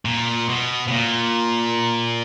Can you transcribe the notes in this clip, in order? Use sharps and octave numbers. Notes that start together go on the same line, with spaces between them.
A#2
B2
B2
A#2